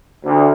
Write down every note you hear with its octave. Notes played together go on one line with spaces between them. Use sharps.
D2